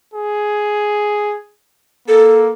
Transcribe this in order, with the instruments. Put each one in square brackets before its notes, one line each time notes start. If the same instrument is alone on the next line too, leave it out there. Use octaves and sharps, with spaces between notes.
[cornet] G#4
[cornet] A#3 [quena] A4